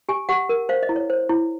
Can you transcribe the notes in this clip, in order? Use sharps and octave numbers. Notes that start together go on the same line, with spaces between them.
G4 G#5
G4 F#5
A#4
C5 F5
D#5
E4
C#5
C5
E4